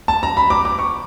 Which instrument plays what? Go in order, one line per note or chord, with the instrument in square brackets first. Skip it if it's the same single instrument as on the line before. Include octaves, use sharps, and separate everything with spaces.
[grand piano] A5
A#5
B5
D6
D6
C#6